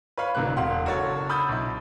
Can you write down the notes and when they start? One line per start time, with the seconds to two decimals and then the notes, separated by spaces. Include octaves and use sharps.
0.17 B4 C#5 F5 B5
0.35 D1 G#2 C3 A#3 F#6
0.56 E1 F5 F#5 C6
0.85 F#1 F#4 A4 C#5 A6
1.29 B5 D#6 E6 G6 A6
1.49 B1 E4